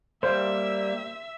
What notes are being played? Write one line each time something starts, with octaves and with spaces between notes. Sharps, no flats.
G3 A#3 C5 E5